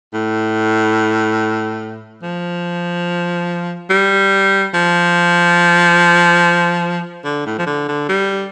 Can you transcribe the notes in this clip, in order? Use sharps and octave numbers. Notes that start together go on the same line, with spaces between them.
A2
F3
G3
F3
D3
A2
F3
D3
D3
G3